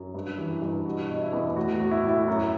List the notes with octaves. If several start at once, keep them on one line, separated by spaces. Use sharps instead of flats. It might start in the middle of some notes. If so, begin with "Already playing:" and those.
Already playing: F#2
G2
E3
G2
B2 F#4
B2
E4
E2
A2 F#4
F#4
A2
E4
A2 E4
F#2